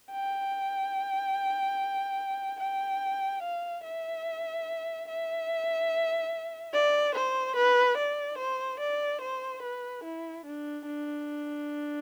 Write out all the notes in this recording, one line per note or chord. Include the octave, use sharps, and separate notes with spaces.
G5
G5
F5
E5
E5
D5
C5
B4
D5
C5
D5
C5
B4
E4
D4
D4